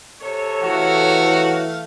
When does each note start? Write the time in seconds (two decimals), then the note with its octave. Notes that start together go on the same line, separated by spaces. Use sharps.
0.21 C3 A4 C#5
0.63 E3 A3 F#4 F5